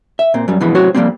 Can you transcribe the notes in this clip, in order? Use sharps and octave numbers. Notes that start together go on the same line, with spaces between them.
E5
A#2 C4
F#2 G3
F2 B2 E3 G#3 B5
F#2 A2 C3 F#4 C5 C#5
F2 F3 G3 A#3 C4